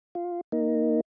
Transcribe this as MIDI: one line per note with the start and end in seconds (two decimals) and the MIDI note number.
0.15 0.41 65
0.52 1.01 58
0.52 1.01 63